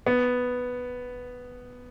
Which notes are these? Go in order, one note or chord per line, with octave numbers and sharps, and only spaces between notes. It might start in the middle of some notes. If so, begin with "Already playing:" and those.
B3